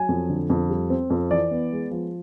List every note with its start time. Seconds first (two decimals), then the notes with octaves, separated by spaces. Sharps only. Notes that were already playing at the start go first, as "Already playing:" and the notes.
Already playing: F#3 G#5
0.09 F2
0.29 D3
0.50 F2
0.70 G3
0.90 C4
1.10 F2
1.31 E3 D5
1.51 B3
1.72 G#3
1.91 F3